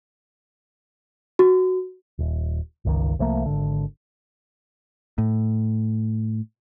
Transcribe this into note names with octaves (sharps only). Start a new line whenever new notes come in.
F#4
D#1
G1 C#2 D#3
C2 F3 A3 A#3
G#1 D3
A2